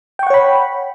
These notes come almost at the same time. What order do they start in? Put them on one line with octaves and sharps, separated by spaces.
G5 C#6 F#5 C#5 B5